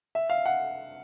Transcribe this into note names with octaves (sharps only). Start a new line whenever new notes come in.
E5
F5
F#5